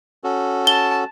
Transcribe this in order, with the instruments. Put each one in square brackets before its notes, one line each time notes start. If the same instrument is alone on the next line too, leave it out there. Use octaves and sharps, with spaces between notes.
[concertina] C#4 F#4 A4
[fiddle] A5 [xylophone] G7